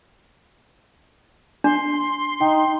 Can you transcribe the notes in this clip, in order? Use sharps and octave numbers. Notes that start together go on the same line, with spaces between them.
D4 C6
D#4 G5